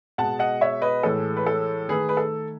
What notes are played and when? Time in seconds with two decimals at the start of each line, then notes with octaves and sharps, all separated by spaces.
0.18 B2 G#3 F#5 A5
0.39 D#5 F#5
0.61 C#5 E5
0.82 B4 D#5
1.03 A2 E3 G#3 A4
1.37 B4
1.47 A4
1.88 D#3 A3 G#4 B4
2.09 B4
2.17 A4